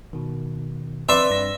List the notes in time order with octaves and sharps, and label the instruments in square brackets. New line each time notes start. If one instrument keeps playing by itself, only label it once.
[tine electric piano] B2 D#3
[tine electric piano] C4 [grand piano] B4 D5 C6 [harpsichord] E5
[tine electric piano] G2 A#6